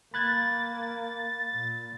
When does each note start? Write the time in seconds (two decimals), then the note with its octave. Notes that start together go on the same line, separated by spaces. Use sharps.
0.14 A#3 B5 F#6 G#6 A6
1.53 A#2